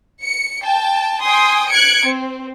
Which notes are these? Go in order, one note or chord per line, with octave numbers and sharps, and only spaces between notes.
C#7
G5 A5
G5 G#5 C6 D#6
F#6 G#6 C#7 D7
C4